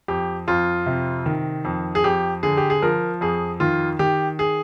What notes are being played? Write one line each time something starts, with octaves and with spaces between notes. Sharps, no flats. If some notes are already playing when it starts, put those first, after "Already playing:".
F2 G4
F2 F4
C3
D#3
F2
G#4
F2 G4
D3 G#4
G4
G#4
F3 A#4
F2 G#4
D#3 F4
D#3 G4
G#4